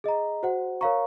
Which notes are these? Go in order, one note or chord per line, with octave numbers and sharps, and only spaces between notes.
G#4 D#5 A#5
F#4 C5 F#5
A#4 C#5 F5 A#5 C#6